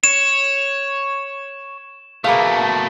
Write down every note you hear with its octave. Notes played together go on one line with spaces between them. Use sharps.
C#5 E7
B2 A3 A#3 G#4 F5